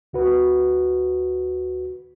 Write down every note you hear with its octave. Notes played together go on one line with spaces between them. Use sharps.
D2 F#4 B4